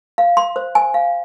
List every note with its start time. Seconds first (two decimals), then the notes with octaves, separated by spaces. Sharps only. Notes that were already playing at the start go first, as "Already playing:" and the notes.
0.18 F5
0.37 C6
0.56 C5
0.75 G#5
0.94 F5